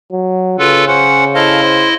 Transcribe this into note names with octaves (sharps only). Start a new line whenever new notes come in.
F#3
C#3 F4 A4 B4
C#4 C5 F#5
E4 A4 C5 D#5 F5
C5